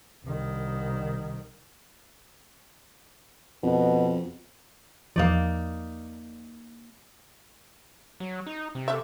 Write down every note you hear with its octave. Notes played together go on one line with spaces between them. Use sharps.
C2 D#3
F2 B2
E2 F3 A#3 D#4 D5
F#3
D#4
C3
A3 E5